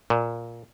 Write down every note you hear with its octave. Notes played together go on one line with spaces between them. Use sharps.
A#2